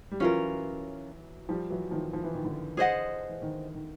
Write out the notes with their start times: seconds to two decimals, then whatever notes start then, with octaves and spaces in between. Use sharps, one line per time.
0.11 G3
0.20 E3 F#3 C#4 F4 A#4
1.49 F3 G3
1.70 E3 F#3
1.91 D#3 F3
2.13 F3
2.24 E3
2.34 D#3
2.45 D3 E3
2.77 G#4 C5 D#5 F#5
3.29 E3
3.42 D#3
3.74 D#3